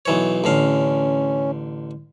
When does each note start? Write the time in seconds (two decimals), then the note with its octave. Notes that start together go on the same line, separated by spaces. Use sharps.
0.06 B1 E3 C#5
0.44 A1 D3 C#4 F5